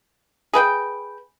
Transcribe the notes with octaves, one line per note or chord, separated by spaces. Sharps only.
G#4 B4 G5